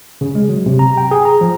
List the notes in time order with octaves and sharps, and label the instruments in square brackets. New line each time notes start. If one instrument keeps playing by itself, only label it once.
[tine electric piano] C#3
G#3
F#3
C3
A#5
G5
G#4
A#5
F3